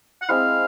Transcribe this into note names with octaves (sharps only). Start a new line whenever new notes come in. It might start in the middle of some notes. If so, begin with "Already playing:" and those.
F#5
G#3 C4 E4 F5